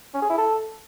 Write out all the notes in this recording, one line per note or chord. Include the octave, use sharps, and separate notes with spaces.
C#4
G#4
E4
A4